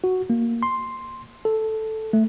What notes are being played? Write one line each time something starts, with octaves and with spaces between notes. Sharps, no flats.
F#4
A#3
C6
A4
A3